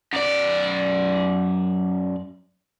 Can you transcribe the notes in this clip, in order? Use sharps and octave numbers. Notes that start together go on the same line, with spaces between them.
F#2 D5